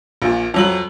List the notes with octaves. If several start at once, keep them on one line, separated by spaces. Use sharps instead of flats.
A#1 A#2
F2 F#3 F#7